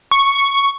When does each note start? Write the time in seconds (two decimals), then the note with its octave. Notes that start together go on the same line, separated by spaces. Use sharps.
0.11 C#6